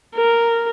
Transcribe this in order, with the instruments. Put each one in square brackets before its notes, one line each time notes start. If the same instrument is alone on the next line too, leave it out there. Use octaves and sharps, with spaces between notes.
[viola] A#4